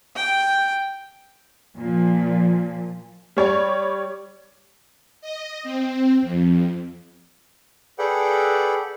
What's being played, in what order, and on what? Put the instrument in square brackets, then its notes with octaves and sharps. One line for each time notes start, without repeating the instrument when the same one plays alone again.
[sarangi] G5
[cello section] A#2 F3
[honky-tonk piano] G3 C#5 D5
[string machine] D#5
C4
F2
[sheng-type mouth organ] G#4 A4 B4 D5 F#5 G5